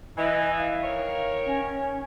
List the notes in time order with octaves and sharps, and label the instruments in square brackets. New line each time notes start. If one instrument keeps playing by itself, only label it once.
[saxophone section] E3 [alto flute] D#5
[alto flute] F5
[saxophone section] D#3 A#4 C#5
[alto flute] C#4